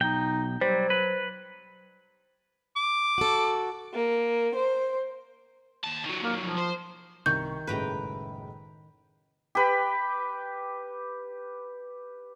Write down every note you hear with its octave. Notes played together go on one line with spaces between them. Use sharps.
B1 D#4 G5
F#3 G3 C5
B4
D6
F#4 A4
A#3
C5
D#2 A5
D#3 F#3
A#3
F3
C5
C2 D#3 C#6 G6
F#1 A2 G#3 B4 G5 A#5
G4 B4